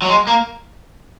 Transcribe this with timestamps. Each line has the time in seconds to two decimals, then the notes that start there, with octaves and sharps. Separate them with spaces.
0.02 F#3
0.08 G#3
0.27 A#3